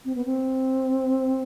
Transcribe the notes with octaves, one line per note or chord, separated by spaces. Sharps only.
C4
B3
C4